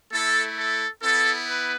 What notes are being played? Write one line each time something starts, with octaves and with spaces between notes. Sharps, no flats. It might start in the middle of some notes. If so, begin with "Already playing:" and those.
A3 E4 A4
A4
B3 E4 A4
B4